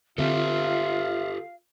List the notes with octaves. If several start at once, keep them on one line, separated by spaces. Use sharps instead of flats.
D3 C4 F4 G4 A4 E5 F5